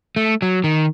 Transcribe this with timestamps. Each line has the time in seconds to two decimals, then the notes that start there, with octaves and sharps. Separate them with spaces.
0.16 A3
0.42 F#3
0.64 D#3